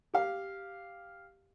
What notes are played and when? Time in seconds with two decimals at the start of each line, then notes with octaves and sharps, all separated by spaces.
0.14 G4 F5